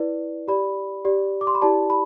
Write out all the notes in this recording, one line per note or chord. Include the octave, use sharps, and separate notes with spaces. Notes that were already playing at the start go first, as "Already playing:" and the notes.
Already playing: E4 B4 D5
G4 D5 B5
G4 D5
D6
C6
B5
E4 G4 D5 A5
B5